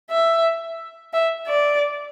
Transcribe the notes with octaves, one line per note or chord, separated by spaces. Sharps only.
E5
E5
D5